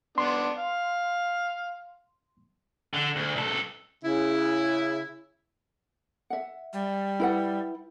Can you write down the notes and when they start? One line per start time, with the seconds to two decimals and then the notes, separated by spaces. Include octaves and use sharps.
0.18 B3 D4 C6
0.57 F5
2.94 D3
3.16 D2
3.36 C#2 A4
4.04 C#3 E4
6.30 E5 F#5
6.73 G3
7.20 E4 B4 F#5